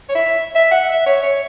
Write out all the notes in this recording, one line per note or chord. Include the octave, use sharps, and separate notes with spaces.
C#5
E5
E5
F#5
E5
C#5
C#5